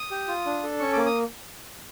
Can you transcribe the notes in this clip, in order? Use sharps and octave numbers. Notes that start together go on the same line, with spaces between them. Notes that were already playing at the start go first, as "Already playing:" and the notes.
Already playing: D#6
G4
F4
D4
A4
C#4 C#6
A#3 D6
D#6